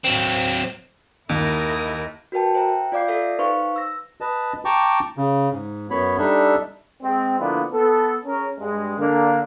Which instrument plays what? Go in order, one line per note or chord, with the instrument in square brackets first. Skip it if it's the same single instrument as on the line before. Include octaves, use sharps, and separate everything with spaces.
[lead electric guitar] F#3 C4
[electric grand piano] D#2 [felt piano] D#3 [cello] E4 A#4 [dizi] D#5
[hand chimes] F#4 A#4 B4 G5 A5
C5 E5 G5 A#5
F4 D5 F5 D6 G6 C7
A4 D5 E5
D#4 B4 C5 F5 C6 C#6
E6 A#6
[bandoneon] B4 D#5 A5
G5 A5 A#5 C#6 D6
C#3
G#2
F#2 B3 C#5 B5
G3 D4 D#4 A4 E5
[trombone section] G#3 C4
D3 F3 A#3 B3 D4 E4
B3 A4
C#4 G#4 A#4
G2 G#3
D3 A#3 D4